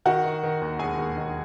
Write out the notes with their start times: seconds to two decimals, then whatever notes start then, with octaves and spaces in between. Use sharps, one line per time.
0.05 D#3 F#4 F#5
0.25 D#3
0.43 D#3
0.61 D#2
0.79 E1 G#4 G#5
0.98 D#2
1.17 D#3